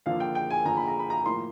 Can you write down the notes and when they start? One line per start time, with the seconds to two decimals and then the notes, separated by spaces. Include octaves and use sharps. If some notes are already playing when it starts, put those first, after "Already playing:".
0.06 D3 F3 A#3 F5
0.20 G5
0.35 G5
0.50 G#5
0.65 D3 F3 A#3 A#5
0.77 B5
0.88 A#5
0.99 B5
1.10 A#5
1.26 A2 F3 A#3 C6